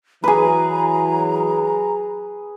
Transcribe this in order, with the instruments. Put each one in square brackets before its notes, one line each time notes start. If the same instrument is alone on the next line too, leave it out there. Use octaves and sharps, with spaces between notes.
[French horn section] E3 F#3 [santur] G#4 B4 [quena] A#5